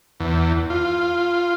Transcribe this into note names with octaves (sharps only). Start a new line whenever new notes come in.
E2
F4